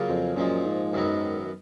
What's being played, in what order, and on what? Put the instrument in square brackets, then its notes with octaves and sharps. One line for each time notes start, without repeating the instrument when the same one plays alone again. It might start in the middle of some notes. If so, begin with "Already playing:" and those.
Already playing: [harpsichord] C#3 F#3 A#3 F4 G#4
[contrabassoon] F2
[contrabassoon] F#2 [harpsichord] A#2 F3 G#3
[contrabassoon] G#2
[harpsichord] F#2 D#3 F#3 B3